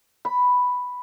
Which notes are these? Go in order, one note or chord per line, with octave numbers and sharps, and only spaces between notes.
B5